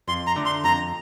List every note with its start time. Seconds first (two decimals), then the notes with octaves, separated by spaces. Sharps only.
0.08 F2 C6
0.27 A#5
0.36 D3 A3 D4
0.46 C6
0.64 F2 A#5